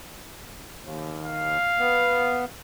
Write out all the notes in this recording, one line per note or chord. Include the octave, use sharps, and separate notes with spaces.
D#2
F5
B3